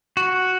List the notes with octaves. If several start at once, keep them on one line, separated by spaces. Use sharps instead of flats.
F#4